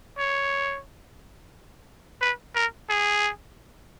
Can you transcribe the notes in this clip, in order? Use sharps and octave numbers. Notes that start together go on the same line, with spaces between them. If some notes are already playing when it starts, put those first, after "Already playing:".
C#5
B4
A#4
G#4